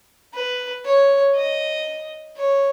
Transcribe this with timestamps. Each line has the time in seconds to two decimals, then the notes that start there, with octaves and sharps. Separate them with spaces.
0.34 B4
0.85 C#5
1.35 D#5
2.37 C#5